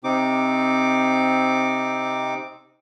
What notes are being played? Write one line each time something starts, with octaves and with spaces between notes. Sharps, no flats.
C3 C4 D#4 D6